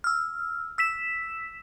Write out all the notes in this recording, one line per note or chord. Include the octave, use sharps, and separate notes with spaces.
E6 F6
E6 B6 E7